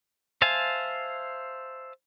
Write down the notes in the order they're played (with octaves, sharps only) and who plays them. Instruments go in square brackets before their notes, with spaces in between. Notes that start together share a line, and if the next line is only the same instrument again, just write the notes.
[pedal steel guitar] C5 E5 F5 G#5 A5